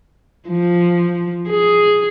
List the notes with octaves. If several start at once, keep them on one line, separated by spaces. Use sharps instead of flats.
F3
G#4